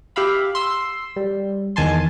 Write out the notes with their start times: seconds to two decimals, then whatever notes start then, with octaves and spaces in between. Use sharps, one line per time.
0.16 G4 E5 F5 B5
0.55 C6 E6
1.16 G3
1.76 E2 D#3 G#5 A5 C6